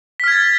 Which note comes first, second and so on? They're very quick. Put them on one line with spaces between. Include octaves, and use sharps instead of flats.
B6 F6 G#6 A6